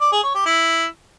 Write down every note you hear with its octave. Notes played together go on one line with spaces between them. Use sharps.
D5
G#4
C#5
G4
E4